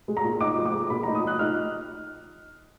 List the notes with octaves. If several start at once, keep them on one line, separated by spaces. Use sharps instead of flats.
G#3
A#5
A#2
D#4 D6
F3
D6
G#3
A#2 B5
D#4 A#5
D#6
F3 F#6
D#4 F6